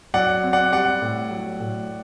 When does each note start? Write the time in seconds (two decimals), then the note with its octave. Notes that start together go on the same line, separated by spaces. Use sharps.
0.14 F#3 D5 F#5
0.43 C4
0.53 D5 F#5
0.72 G3 D5 F#5
1.02 A2
1.31 F#3
1.60 A2